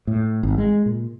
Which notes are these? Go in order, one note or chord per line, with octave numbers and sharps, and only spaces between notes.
A2
G#1
G#3
A#2